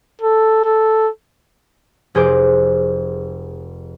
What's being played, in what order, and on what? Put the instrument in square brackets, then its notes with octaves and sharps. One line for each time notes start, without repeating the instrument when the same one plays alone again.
[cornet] A4
A4
[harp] F1 G#4 C5 D6